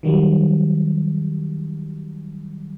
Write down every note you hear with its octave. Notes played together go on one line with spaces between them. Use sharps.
D#3 F#3 G3